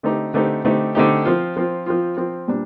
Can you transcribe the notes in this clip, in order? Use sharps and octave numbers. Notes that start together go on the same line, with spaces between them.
D3 A3 C4 D#4 G4
D3 A3 C4 D#4 G4
D3 A3 C4 D#4 G4
D3 A3 C4 D#4 G4
F3 C4 F4
F3 C4 F4
F3 C4 F4
F3 C4 F4
A#2 G3 D4